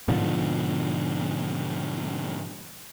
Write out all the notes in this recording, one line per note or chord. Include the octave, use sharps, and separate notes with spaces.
G#2 B2 D3 F3